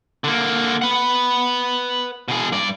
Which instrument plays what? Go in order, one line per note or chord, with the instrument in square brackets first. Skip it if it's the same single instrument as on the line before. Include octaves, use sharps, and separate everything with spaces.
[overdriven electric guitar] D3 A#3
B4 F#5
B2 G#4
G2 D5